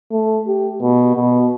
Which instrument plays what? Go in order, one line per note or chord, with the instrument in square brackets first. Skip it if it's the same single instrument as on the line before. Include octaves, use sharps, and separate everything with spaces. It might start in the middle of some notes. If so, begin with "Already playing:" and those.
[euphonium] A3
G4
B2
B2